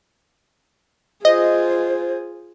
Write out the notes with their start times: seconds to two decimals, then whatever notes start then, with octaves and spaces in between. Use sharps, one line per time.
1.25 F4 G#4 C5 D#5